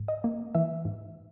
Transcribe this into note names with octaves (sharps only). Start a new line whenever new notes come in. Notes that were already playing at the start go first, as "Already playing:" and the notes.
Already playing: G#2
D#5
A#3
E3 E5
G#2